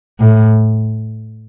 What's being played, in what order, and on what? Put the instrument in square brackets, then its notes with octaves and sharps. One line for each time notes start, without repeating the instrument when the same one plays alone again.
[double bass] A2